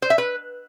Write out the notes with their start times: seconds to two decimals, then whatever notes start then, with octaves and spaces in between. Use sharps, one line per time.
0.02 C5
0.10 E5
0.18 B4